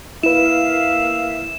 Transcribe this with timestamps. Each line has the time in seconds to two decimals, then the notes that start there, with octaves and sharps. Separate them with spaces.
0.23 A#3 E4 B4 E5 F5 E7